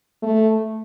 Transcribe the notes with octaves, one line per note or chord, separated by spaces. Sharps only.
A3